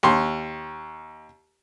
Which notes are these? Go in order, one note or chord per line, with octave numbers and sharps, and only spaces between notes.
D#2 C6